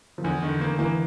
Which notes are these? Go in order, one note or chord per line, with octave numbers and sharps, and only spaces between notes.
F3
E2 D3 E3
D3 D#3
D3 A#3
D3 E3 A#3